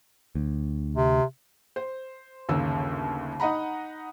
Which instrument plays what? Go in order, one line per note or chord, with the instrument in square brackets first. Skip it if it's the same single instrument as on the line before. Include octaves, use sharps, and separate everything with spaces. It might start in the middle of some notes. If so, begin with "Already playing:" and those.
[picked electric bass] D2
[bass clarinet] C3
[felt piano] C5
G1 D#2 C#3 A#3 E6
D#4 D#5 F#5 A#5 B5